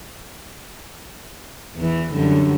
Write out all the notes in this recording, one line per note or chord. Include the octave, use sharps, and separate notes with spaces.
E2 E3
F#2 D3 G3